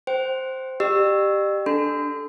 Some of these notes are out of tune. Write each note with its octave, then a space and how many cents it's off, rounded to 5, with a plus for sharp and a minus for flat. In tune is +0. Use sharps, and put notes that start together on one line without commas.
C5 +0 G5 -25
G4 +0 D5 +45 E6 +0
D4 +0 A4 -15 C6 -40